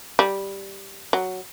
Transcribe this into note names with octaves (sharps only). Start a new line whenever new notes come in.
G3
F#3